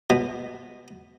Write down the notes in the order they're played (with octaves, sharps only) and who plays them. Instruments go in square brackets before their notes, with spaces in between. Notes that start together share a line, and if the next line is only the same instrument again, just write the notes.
[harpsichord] B2